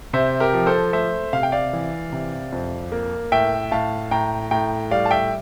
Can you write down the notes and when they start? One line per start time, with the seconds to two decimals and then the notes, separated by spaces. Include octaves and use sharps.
0.13 C3 C5 E5
0.40 G4 A#4
0.53 F3
0.66 A4 C5
0.93 A3 C5 E5
1.33 C3 F5
1.43 G5
1.52 D5 F5
1.73 E3
2.12 C3
2.52 F2
2.92 A#3
3.32 A2 E5 G5
3.71 A2 F5 A5
4.11 A2 G5 A#5
4.51 A2 G5 A#5
4.91 G3 D5 F5
5.06 A5
5.11 E5 G5